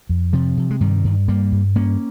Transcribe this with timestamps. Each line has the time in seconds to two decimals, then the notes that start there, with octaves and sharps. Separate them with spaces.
0.09 F2
0.33 C3 F3
0.57 C3
0.71 G#3
0.80 G2 D#3 G3
1.04 G2
1.28 G2 G3 A#3
1.52 G2
1.75 G2 A#3 C#4